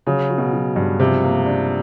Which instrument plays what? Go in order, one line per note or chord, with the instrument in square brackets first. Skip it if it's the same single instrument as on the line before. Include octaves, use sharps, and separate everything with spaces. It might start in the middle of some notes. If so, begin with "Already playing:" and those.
[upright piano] C#3 [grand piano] F#3
[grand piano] F#3
[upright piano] B2
[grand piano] F#3
G2
[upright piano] C3 [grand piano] F3
[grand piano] A#3
D4